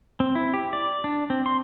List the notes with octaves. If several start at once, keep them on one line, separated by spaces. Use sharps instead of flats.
C4
E4
G4
D5
D4
C4
C6